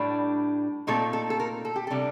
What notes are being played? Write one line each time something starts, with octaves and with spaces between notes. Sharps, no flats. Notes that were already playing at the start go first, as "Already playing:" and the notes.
Already playing: A2 G3 D4
A#2 A3 C4 D#4 A4
A4
A4
A#4
A4
G4
C3 G3 D4 A4